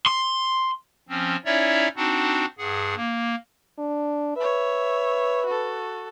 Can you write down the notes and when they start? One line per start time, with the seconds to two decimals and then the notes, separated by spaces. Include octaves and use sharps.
0.06 C6
1.09 F3 C4 C#4
1.45 C#4 D#4 E4 C#5 D5 E5
1.96 C4 D4 D#4 F#4 F#5
2.58 G2 G#4 F#5
2.96 A#3
3.78 D4
4.36 B4 C#5 E5
5.46 F#4 A4